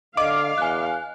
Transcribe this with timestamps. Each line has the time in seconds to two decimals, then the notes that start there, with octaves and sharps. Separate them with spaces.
0.17 D3 D#5 F5 D6
0.58 E2 G#5 F#6